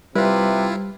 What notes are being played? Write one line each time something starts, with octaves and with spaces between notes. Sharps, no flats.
C3 G3 E4 F4 B4